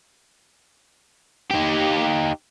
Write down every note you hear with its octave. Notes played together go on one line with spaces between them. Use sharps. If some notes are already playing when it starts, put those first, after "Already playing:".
D#4 G4